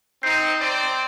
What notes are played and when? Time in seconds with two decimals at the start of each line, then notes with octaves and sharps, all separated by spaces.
0.23 C4 D#4 G6 C7
0.59 C4 C5 D5